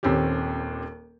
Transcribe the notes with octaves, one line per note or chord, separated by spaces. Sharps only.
D#1 D#2 C4 C#4 G4